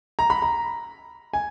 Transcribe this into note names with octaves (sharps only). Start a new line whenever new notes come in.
A#5
B5
A#5
G#5